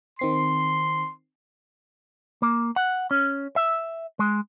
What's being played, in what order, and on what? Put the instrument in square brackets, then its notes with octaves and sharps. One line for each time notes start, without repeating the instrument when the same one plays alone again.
[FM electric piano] D#3 C4 C7 [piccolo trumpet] C6
[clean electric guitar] A#3
F#5
C#4
E5
G#3